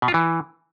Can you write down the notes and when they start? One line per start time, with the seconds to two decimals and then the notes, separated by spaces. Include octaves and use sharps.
0.02 B2
0.08 F4
0.14 E3